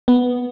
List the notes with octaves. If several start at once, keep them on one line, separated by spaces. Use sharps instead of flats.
B3